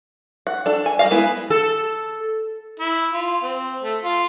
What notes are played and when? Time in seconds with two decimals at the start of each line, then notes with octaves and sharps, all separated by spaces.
0.47 F#5
0.66 D4 A4
0.86 G#5
0.99 G3 D#5 F5
1.11 G#3 B3 E4 B4
1.50 A4
2.80 E4
3.13 F4
3.43 C4
3.83 A3
4.04 F4